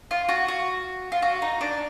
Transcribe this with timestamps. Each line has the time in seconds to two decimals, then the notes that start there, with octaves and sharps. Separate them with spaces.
0.11 F4
0.29 F#4
0.48 F#4
1.12 F4
1.22 F#4
1.42 D#4
1.61 D4